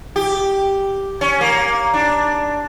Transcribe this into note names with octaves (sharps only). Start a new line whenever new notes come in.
G4
C#4
A#3
D4